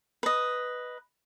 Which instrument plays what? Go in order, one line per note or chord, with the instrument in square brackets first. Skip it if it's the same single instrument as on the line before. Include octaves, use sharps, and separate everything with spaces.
[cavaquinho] B4 D#5